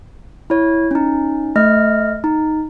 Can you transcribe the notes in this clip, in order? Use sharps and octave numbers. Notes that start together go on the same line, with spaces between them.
E4 C#5
C#4 D#4
A3 D#5 F6
D#4